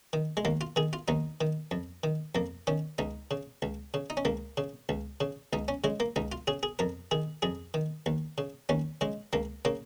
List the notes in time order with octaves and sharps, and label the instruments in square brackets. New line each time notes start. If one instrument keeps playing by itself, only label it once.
[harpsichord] D#3
G#3
D#2 A#3
F4
D#3 G#4
F4
D#2 D#4
D#3
F2
D#3
F2 A#3
D#3 C#4
C#2 D#4
C#3
C#2
C#3
D#4
C#4
C#2 A#3
C#3
C#2
C#3
C#2 D#4
C#4
C#3 G#3
A#3
C#2 D#4
F4
C#3 G#4
G#4
F2 A#4
D#3 G#4
F2 G#4
D#3
D#2
C#3
D#2 C#4
C#3 G#3
C#2 A#3
C#3 A#3